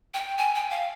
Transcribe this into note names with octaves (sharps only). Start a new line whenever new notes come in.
G5
G#5
G5
F5